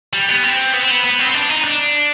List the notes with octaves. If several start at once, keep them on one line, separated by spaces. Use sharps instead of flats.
G3
B3
C4
B3
C4
B3
B3
C4
C4
D4
D#4
D4